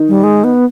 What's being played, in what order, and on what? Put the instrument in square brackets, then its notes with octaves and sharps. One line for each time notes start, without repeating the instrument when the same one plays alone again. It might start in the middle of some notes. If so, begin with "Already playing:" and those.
Already playing: [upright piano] D#3 D#4
[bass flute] G3
G#3
B3